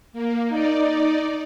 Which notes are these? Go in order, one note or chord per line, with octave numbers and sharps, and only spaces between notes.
A#3
D#4 D5